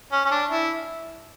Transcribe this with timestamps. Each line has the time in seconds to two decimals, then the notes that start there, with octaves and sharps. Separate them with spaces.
0.12 C#4
0.25 C#4
0.31 D4
0.50 E4